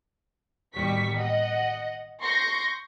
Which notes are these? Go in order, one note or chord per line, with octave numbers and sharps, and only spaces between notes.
A1 D#2 B2 G3 C#6 B6
D#5 F#5
C6 C#6 G6 A#6 C#7